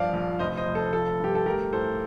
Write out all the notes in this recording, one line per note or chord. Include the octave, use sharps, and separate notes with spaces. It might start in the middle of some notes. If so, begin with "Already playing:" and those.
Already playing: G2 F3 D5 F5
A#1
F1 C5 D#5
C5 D#5
F1
A4 C5
F3 A4
G2 G4
A4
A3 G4 A#4
A2 A4 C5